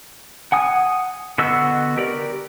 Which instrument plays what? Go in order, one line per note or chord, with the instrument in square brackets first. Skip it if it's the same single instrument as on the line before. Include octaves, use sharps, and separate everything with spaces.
[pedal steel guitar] F#5 G#5 D#6
D3 B3 F#4 D#5 E6
G4 A#4 D5